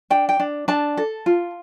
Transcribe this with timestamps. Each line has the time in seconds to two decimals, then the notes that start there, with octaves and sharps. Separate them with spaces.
0.10 D4 G5
0.29 G5
0.40 D4
0.68 D4 A5
0.97 A4
1.26 F4